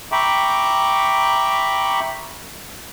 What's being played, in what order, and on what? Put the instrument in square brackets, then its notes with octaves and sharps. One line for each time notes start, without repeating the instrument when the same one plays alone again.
[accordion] E5 G5 A#5 B5 C#6 D6